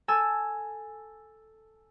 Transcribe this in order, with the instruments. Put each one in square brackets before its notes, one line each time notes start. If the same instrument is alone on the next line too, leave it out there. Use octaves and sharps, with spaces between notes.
[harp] A4 G#5 E6